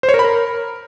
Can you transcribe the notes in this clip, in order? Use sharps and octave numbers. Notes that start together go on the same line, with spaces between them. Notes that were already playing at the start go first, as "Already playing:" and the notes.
C5
C#5
A#4
B5
A#4